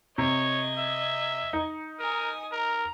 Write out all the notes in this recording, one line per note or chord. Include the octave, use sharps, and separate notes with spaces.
C3 C#5 D#5 G#6
E5
D#4
A#4 G#5 D#6
A#4 A#5